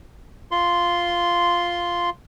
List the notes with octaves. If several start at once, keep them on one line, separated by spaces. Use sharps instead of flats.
F4 C6